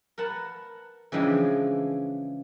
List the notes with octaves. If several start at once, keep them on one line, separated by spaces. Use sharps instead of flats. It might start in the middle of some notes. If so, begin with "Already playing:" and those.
A#4 B4 F#5 A5
C#3 E3 F3 G#3 C4 D4